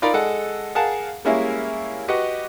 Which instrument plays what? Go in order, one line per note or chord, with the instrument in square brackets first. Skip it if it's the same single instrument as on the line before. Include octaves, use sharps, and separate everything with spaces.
[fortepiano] D#4 F4 A#4 D5 B5
G#3 A4 D#5 F#5
G#4 A#4 F5 F#5 A5
G3 G#3 A#3 C#4 E4 A#4
F#4 G4 B4 D#5 F#5